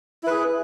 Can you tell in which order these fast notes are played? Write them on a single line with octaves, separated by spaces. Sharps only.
E4 B4 G#4